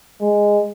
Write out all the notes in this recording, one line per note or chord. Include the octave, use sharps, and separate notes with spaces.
G#3